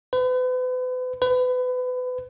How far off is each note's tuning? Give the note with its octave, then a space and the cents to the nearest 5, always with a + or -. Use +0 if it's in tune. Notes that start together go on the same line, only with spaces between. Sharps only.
B4 +40
B4 +30